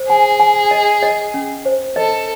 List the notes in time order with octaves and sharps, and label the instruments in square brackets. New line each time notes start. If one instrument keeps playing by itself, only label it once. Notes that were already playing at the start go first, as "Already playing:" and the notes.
Already playing: [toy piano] C5
[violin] G#4 [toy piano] G#5
[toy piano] G#5
D#5
D#5
C#4
C5
[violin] A4 [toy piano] D#5